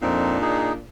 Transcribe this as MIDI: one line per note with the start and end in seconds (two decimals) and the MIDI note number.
0.02 0.38 41
0.02 0.79 46
0.02 0.38 60
0.02 0.79 62
0.02 0.38 63
0.41 0.73 63
0.41 0.73 68